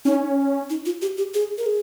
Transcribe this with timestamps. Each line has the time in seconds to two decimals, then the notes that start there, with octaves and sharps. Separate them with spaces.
0.05 C#4 D#4
0.70 D#4
0.86 F4
1.02 G4
1.18 G4
1.34 G#4
1.58 A#4
1.66 G#4